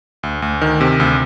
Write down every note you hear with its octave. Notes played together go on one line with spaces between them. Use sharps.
D2
D2
D#3
C3
D2